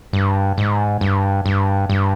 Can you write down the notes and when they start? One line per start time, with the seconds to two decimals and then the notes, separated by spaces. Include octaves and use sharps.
0.13 G2
0.58 G#2
1.01 G2
1.46 G2
1.90 G2